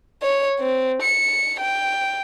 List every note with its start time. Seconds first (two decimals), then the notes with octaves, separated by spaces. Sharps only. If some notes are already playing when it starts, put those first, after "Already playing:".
0.23 C#5
0.60 C4
1.02 C#7
1.60 G5